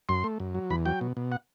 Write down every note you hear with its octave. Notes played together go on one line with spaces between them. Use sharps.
F#2 C6
A3
F#2
F#3
E2 B5
F#3 G5
B2
B2
F#5